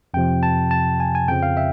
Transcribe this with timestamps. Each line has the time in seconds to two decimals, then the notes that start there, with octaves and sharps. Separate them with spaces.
0.14 F2 C3 F3 G5
0.43 A5
0.71 A5
1.00 G#5
1.15 G#5
1.28 F2 C#3 F3 G5
1.43 F5
1.57 E5